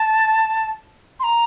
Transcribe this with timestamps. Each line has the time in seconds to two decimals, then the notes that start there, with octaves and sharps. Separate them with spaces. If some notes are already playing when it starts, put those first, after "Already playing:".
Already playing: A5
1.20 C6
1.24 A#5